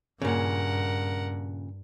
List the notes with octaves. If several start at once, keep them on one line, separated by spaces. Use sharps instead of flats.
G2 A#2 C#3 A#4 F#5